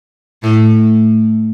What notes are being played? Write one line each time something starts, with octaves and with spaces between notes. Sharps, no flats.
A2 A3